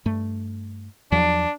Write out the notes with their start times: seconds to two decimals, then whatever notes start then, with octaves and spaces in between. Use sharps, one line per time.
0.06 G2 A3
1.12 E2 F3 F#3 D4